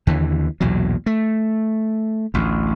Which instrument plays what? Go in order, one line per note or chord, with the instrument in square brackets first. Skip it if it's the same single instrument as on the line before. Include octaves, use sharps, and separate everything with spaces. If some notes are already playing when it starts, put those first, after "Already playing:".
[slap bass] D#2 D3 E3
B1 E2 A#2 F#3
A3
A1 D2